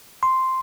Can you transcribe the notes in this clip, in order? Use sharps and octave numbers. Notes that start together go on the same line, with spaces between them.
C6